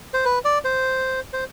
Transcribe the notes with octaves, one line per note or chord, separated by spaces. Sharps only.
C5
B4
D5
C5
C5